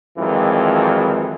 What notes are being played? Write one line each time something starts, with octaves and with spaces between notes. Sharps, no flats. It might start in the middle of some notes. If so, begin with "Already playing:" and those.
F2 D#3 E3 F#3 G#3